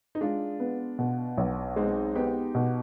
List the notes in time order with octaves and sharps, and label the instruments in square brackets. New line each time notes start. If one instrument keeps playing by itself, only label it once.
[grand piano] D#4
[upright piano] G#3 [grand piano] D4 F4
[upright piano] B3
B2
B1
[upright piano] G#3 [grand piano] C4 D#4
[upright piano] B3 [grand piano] D#4 G4
[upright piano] B2